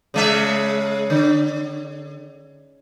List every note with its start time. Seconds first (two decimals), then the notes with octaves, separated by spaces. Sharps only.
0.14 C#3 G#3 E5
1.10 D3